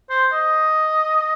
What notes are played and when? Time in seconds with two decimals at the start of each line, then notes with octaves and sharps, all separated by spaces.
0.10 C5
0.33 D#5